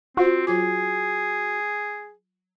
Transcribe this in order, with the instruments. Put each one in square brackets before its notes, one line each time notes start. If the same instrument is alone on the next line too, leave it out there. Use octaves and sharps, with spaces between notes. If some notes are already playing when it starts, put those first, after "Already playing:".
[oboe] C4 [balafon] F4 C5 [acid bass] F#4
[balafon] F#3 F4 D6 [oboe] G#4